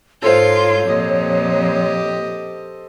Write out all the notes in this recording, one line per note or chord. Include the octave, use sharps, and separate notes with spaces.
G#2 F4 A4 C5 C#5 C6 G6
F2 A#2 G4 D#5